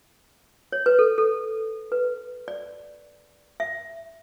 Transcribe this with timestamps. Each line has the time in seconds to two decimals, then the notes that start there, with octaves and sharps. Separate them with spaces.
0.72 C#5
0.86 B4
0.99 A4
1.18 A4
1.92 B4
2.48 D5
3.60 E5